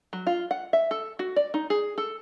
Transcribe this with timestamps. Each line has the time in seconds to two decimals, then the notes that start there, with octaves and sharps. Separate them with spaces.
0.13 F#3
0.27 F4
0.51 F#5
0.73 E5
0.91 A4
1.19 F#4
1.36 D5
1.54 D#4
1.70 G#4
1.98 A4